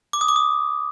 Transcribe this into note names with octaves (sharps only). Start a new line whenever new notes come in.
D6
D#6
D6
D#6